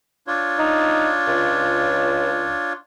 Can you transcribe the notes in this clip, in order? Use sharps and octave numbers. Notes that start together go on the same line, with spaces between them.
D4 F4 C#5
D#4
C#2